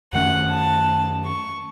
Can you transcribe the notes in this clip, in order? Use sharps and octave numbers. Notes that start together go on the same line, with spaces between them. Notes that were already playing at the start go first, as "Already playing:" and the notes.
F#2 D#3 A3 C#4 F#5
A5
C#6